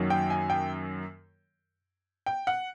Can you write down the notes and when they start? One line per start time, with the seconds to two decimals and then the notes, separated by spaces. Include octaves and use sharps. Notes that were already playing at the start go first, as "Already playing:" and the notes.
Already playing: F#2 D#3 F#3 A#3
0.10 G5
0.30 G#5
0.50 G5
2.26 G5
2.47 F#5